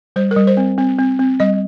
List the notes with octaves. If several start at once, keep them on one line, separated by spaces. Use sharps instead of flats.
G3 C5
A#4
G3
C5
C4
C4
C4
C4
G3 D#5